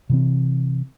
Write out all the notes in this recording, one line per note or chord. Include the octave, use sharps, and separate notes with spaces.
C3 E3 C4